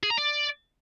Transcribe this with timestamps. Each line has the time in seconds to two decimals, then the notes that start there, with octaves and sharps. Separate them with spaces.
0.03 G#4
0.10 A#5
0.17 D5